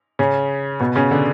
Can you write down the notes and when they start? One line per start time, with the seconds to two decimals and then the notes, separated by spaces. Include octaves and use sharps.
0.19 C#3 C#4
0.80 B2 B3
0.95 C#3 C#4
1.11 D3 D4